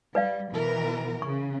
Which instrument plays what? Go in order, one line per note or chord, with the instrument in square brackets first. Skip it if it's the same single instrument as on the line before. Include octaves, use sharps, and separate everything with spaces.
[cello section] G3 [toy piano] B4 D5 F5
[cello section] B2 E3 A#4
[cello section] C#3 [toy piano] C#6